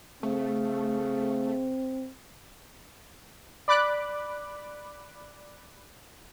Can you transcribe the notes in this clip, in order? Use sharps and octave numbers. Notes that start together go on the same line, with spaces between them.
C#3 A3 C4
D5 B5 D6 F#6